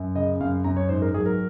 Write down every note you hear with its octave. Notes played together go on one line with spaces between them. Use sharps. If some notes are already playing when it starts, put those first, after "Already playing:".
Already playing: F#2
C#3 D#5
F#2 F5
F#2 A#5
C#5
G#2 C5
A#4
F#3 G#4
A#4